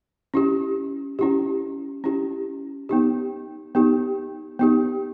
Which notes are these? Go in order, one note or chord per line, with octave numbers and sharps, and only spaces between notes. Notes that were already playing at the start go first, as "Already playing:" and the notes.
C#4 E4 G4
C#4 E4 G4
C#4 E4 G4
B3 D#4 G4
B3 D#4 G4
B3 D#4 G4